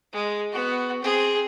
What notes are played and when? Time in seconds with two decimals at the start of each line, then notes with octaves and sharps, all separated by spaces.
0.13 G#3
0.52 B3 F#4
1.02 C4 G#4